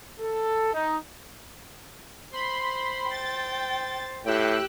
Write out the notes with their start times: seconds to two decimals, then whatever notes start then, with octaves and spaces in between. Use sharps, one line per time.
0.19 A4
0.73 D#4
2.33 C5 B5 C6
3.10 G5 A6
4.25 A2 G4 G5 E6 F#6